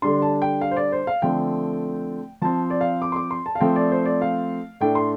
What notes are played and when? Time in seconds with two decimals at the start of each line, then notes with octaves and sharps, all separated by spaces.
0.02 D3 G3 D4 C6
0.22 A5
0.42 G5
0.61 F5
0.71 C5
0.77 D5
0.92 C5
1.07 F5
1.22 D3 F3 A3 C4 G5
2.42 F3 C4 A5
2.70 D5
2.81 F5
3.02 D6
3.12 C6
3.16 D6
3.31 C6
3.46 A5
3.55 F5
3.61 F3 A3 C4 G5
3.76 D5
3.92 C5
4.06 D5
4.22 F5
4.81 A2 A3 D4 G5
4.95 C6